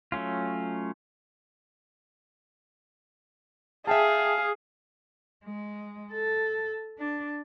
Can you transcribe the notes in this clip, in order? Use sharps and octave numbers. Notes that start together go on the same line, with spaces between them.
F#3 A3 C#4 F4
G#4 E5 F5 G5 A5
G#3
A4
D4